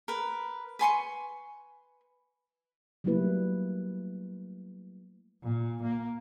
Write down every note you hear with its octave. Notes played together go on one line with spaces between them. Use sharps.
A#4 B4
B4 G#5 C6 C#6
F#3 G3 A3 A#3 E4 B4
A#2
A#3